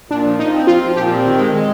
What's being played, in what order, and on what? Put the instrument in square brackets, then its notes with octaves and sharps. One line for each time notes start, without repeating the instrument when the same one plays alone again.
[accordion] A#2 [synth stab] D4
[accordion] F3
[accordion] F3 [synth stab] D#4
[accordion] C4
[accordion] F3 [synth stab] F4
[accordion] F3
[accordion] A#2 [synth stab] G4
[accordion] C4
D#3
G#3
G#3